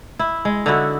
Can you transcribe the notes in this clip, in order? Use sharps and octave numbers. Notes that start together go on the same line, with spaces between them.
E4
G#3
D3 D#4 E4 F#4